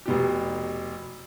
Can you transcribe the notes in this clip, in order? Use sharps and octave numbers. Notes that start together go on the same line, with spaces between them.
F1 B2 G4